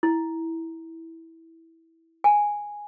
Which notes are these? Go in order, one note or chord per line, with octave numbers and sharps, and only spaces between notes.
E4
G#5